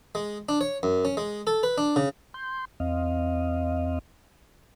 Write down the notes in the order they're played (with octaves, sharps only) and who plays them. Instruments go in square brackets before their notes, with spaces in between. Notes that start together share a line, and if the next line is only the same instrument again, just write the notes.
[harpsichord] G#3
D4
C#5
F#2
C#4
G#3
A4
B4
D4
C#3
[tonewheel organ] C6 G6
E2 C4 D#5 F5